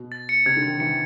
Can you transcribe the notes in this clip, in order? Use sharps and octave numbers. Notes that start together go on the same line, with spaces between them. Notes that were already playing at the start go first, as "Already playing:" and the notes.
Already playing: B2
A6
C#7
C3 G#6
D3
G#6
D#3
E3 C#7